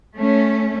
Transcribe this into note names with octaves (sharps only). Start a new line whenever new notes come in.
A3 C#4